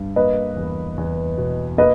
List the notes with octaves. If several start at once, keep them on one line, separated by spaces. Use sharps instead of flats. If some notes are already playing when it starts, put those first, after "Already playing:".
Already playing: G2
A#3 B4 D#5
E2
E2
B2
A#3 B4 D#5